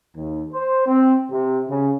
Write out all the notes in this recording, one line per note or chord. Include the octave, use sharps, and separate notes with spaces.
D#2
C5
C4
C3
C#3